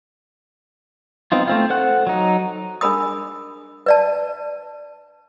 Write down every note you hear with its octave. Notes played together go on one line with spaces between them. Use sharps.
B3 C4 D#4 F4
A3 C4 F4
A4 C5 F#5 F#6
F#3 D#4
D4 G#4 A#4 B5 D#6
B4 D5 A5